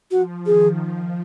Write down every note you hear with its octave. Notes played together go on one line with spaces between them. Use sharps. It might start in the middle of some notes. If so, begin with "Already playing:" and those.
F3 F#4
D#3 G#4
F3